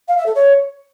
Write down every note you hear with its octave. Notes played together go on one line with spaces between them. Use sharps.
F5
E5
A4
C#5